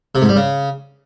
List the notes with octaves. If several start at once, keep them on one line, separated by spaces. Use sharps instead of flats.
C3
G#2
G3
C#3